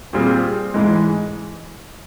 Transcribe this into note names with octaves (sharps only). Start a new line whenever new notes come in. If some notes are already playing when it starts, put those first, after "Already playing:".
A#2 G3 C4 F4 G#4
G#2 E3 G#3